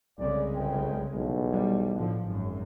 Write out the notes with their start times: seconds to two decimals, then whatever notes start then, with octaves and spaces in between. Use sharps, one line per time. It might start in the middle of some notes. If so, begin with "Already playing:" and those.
0.19 C2 C#3 G#3 A3 D5
0.54 G1 G5
1.15 B1 E2
1.50 G3
1.95 A2 D3 F3
2.25 G#1 F#2